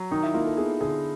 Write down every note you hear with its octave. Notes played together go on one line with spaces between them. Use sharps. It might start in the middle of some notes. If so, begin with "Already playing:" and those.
Already playing: F#3
D#3 D#4
E4
A#3 F4
A4
B3 G#4
D3 G#4